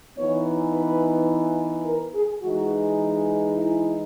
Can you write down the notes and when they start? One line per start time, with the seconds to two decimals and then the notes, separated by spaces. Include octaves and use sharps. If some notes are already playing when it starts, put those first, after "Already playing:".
0.18 E3 B3 D#4 C#5
0.74 B4
1.85 A#4
2.13 G#4
2.42 E3 G#3 D#4 F#4
3.54 E4